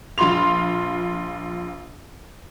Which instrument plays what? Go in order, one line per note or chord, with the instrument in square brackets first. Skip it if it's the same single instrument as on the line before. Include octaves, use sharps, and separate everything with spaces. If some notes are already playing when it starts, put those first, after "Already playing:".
[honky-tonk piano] A#1 F4 B5 C6 F7